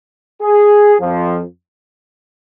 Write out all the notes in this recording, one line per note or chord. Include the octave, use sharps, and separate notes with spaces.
G#4
F2 F3